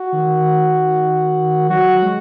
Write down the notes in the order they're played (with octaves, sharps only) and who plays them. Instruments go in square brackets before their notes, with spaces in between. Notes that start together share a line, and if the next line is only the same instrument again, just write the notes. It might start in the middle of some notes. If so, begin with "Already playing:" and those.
Already playing: [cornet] F#4
[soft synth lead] D#3
[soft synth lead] F#3 [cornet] F#4
[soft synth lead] G#3